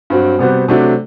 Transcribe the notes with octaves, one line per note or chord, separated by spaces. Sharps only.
G2 F#3 C4 F#4
C3 G3 B3 F#4 C5
C3 F#3 A3 D4 F#4